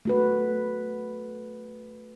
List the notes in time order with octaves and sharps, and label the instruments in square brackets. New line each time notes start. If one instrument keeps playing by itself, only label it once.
[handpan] A3 F#4 B4